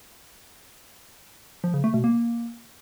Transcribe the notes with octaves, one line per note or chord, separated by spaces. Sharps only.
F3
C#3
A3
B2
A#3